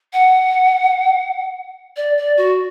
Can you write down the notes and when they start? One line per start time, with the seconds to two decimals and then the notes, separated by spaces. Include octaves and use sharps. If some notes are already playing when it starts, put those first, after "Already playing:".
0.13 F#5
1.96 D5
2.17 D5
2.37 F#4